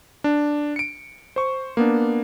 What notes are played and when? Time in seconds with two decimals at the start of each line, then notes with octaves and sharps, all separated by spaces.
0.24 D4
0.76 C#7 D7
1.36 C5 C#6
1.77 A#3 B3 D4